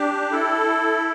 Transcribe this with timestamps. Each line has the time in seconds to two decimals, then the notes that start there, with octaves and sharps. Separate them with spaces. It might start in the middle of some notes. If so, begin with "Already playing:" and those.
Already playing: D4 G4
0.31 E4 A4